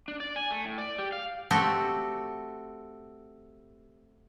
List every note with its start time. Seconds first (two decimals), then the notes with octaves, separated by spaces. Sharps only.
0.08 D4
0.20 D5
0.36 G#5
0.51 A3
0.65 A2
0.78 D5
0.98 G4
1.12 F5
1.51 A3 C4 F#4 G4 A4